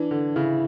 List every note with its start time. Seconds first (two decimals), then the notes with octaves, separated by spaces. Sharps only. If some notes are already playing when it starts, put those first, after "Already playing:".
Already playing: E3 D4
0.11 D3
0.36 C#3 E4